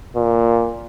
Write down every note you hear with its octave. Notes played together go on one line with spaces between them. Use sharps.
A#2